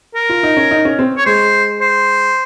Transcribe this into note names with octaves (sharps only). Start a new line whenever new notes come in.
A#4
F4
D#4
C#4
D#4
C#4
C4
C#5
G#3 C5
C5